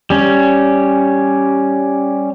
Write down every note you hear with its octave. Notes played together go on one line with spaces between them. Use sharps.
G3 C#4